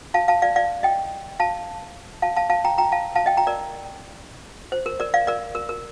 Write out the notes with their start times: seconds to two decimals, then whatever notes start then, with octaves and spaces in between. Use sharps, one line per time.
0.14 F5 A5
0.28 F5 A5
0.42 D5 F5
0.56 D5 F5
0.83 D#5 G5
1.40 F5 A5
2.22 F5 A5
2.36 F5 A5
2.50 F5 A5
2.65 G5 A#5
2.78 G5 A#5
2.92 F5 A5
3.16 F5 A5
3.26 D#5 G5
3.37 G5 A#5
3.47 A#4 D5
4.72 C5
4.86 A#4
5.00 A#4 D5
5.14 D5 F5
5.27 A#4 D5
5.55 A#4
5.69 A#4